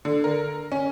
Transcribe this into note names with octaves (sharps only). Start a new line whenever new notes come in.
D3
A#4
C#4